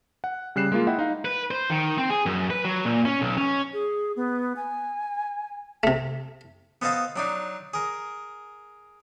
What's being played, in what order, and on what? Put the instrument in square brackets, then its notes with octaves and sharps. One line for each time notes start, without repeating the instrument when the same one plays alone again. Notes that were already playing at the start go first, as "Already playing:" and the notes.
[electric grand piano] F#5
C#3 G3 F#6 C7 E7
G#3 A#3 F4
E4 D#5 F#5 G5
D#4 F5
[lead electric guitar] B4
C5
D#3
C4
G#4
F#2
B4
F#3
A#2
C#4
B1
C#4
[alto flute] G#4
B3
G#5
[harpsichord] C3 A3
B3 A4 C5 D#5 F5 A5
F#3 D4 D#4
G#4 A#4